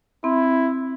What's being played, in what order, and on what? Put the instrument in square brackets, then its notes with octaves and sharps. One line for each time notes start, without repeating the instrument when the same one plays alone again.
[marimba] C4 [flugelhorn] E4